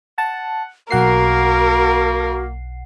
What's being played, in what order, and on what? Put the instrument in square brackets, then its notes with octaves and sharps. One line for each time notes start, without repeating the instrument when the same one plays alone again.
[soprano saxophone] F#5 [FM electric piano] A5
[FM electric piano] B1 F#5 C7 [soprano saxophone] A#3 [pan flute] F#4 [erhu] A#4